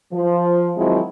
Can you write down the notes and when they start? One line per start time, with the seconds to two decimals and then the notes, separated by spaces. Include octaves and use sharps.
0.13 F3
0.77 D#3 F3 F#3 G#3 C4 E4